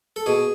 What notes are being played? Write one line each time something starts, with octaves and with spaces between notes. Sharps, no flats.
A4
B2 G#4